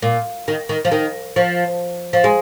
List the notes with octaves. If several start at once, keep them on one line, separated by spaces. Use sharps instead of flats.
A#2
D#3
D#3
F3
D#3
F3
F3
G#3